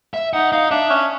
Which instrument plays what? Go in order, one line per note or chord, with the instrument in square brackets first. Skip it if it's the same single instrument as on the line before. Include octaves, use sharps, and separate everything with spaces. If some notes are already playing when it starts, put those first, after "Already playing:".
[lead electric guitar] E5
[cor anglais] D#4 [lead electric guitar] F#5
[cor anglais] D#4 [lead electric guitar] F5
[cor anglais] D4 [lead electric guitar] E5
[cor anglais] C#4